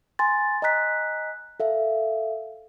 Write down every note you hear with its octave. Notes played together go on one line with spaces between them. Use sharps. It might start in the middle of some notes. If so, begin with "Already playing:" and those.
G#5 C6 A6
D#5 G#5 A#5 F#6 B6
A4 E5 F5